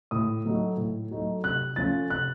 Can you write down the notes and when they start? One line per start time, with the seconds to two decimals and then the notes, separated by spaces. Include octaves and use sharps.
0.11 A2 D#6
0.45 F#3 A3 D#4 F#4
0.77 A2
1.11 F#3 A3 D#4 F#4
1.43 C3 F#6
1.76 F3 A3 C#4 F4 A6
2.10 C3 F#6